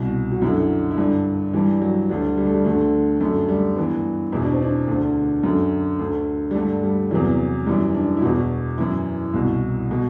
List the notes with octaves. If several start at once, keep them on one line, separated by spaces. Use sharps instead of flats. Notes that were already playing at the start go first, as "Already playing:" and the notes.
Already playing: C2 B2
F#4
F#2 E4
D3
E4
G2 D3 D4
G2 E3 G3
F#3
D2 D3 G3
G3
A3
G3
D2 D3 A3
F#2 A3
D3
G3
G2 E3 B3
E2 B2 E4
D4
C4
D4
D2 D3
F#2 D3
D2 D3
G3
G2 D3 A3
G3
E2 C3 E3 F#3
F#2 E3 G3
D4
E4
E2 B2 F#4
F#2 E3 E4
C2 B2
B2